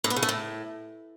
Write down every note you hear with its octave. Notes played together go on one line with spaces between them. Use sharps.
A2
B3
C#3
A3
A2